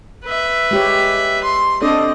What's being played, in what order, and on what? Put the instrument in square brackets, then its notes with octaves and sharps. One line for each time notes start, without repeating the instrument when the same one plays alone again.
[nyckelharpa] B4 E5
[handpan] G#3 G4 C#5
[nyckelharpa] C6
[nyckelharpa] C4 D#5 [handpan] D4 A4 D5